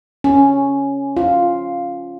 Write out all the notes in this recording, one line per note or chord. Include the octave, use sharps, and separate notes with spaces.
C#4
F4